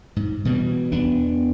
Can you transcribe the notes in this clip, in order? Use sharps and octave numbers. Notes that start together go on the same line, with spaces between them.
G#2
B2 E3 G3
E2 B3 D4